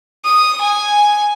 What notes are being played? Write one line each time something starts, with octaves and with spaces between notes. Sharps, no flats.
D#6
G#5